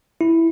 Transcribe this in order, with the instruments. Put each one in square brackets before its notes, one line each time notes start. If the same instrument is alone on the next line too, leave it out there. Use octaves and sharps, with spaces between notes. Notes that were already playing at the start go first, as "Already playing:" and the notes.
[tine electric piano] E4